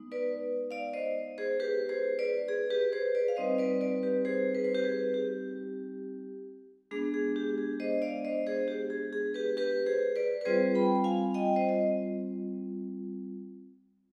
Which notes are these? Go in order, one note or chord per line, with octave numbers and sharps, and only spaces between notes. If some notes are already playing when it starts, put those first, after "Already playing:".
Already playing: G#3 B3 D#4
B4 D5
D5 F5
C5 D#5
G#4 C5
G4 B4
G#4 C5
B4 D5
G#4
G4 B4
G#4 C5
B4 D5
F5
G3 C4 D#4 C5 D#5
B4 D5
B4 D5
G4 B4
G#4 C5
B4
C5
G4 B4
G#4
G4
G#3 B3 D4 G#4
G#4
G4
G#4
C5 D#5
D5 F5
C5 D#5
G#4 C5
G4
G#4
G#4
G4 B4
G4 B4
G#4 C5
B4 D5
B4
G3 C4 F4 G#4 C5
G5 B5
F5 G#5
D#5 G5
C5 D#5
D#5